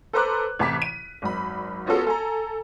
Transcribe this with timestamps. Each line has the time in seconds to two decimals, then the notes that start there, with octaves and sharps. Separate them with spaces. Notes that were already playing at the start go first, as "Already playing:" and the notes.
0.13 A4 B4 C5 A#5 D6 F#6
0.59 A1 C3 A5 D6 B6
0.82 D#7
1.22 G#1 F#2 B5
1.86 B3 C#4 F4 F#4 G#4 A4
2.07 A4 G#5 A#5